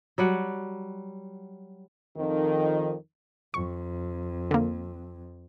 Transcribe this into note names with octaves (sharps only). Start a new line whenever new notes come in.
F#3 G3 F#5
F2 D#3
F2 C#6
D3 A#3